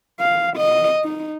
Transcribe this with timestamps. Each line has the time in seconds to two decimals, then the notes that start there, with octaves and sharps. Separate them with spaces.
0.20 F5
0.57 D#5
1.04 D#4